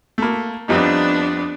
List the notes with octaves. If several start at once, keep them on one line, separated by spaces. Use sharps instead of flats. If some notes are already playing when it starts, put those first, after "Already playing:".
A3 A#3
F2 G3 B3 D4 D#4